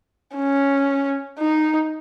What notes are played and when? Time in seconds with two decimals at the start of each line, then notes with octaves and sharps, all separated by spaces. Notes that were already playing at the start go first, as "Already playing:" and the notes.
0.36 C#4
1.39 D#4